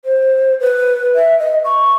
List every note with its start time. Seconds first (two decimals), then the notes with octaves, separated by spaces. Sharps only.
0.05 C5
0.61 B4
1.15 E5
1.40 D#5
1.65 C#6